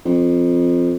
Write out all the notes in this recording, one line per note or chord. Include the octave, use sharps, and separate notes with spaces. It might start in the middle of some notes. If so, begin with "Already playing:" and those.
F2